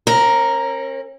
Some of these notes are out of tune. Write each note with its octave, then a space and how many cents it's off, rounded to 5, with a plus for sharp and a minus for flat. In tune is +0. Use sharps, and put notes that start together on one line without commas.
C#4 -40 A#4 +0